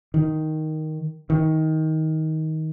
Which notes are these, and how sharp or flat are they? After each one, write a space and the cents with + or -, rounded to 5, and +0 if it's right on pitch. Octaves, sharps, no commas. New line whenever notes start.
D#3 +5
D#3 +20